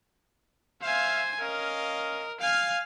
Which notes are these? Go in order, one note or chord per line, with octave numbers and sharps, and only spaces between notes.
C5 E5 F5 G#5
C#4 A#4 D#5 F5
F5 G#5 F6